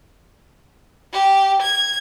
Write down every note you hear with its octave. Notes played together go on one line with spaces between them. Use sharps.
G4
G#6